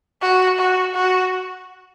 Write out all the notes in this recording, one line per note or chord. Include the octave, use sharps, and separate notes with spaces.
F#4
F#4
F#4